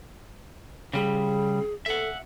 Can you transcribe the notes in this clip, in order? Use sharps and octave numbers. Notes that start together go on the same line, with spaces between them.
C#3 G3 G#4
A4 E5 F#5